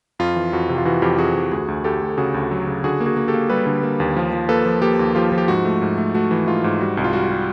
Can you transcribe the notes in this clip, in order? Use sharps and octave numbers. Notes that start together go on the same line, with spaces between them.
F2 F4
E3
F2 F#4
C3
F4
E3 F#4
F2 F4 G4
F2 F#4 G#4
F2
D2 F#4 G#4
D2
D2 G4 A4
D2
C#3 F#4 G#4
D2
F#3
C#3
D3 F#4 G#4
A#3
F#4 G#4
A#3
G4 A4
A#3
G3 A4 B4
D3
A#3
D#2
F3
F3
A#3 A4 B4
F3
A#3 G4 A4
D#2
F3 F4 G4
F3
G4
G#2 F#4
A3
G#2
A3
A3 F#4
E3
G#2 F4
G#2
G3 F#4
C2
F4
G3 F#4
G3